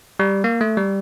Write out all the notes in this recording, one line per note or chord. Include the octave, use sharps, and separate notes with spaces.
G3
A#3
A3
G3